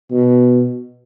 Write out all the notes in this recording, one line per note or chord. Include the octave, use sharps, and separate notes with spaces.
B2